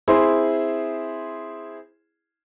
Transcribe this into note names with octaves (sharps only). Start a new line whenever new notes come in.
C4 E4 G#4 C6